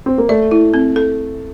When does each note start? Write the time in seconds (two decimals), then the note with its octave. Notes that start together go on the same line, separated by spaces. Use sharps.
0.06 C4
0.18 A#3
0.29 A3 D5
0.51 E4
0.74 C4
0.96 A4